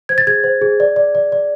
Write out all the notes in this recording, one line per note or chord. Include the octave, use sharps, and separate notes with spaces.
C5 G#6
A6
G#4 G#6
C5
G#4
D5
D5
D5
D5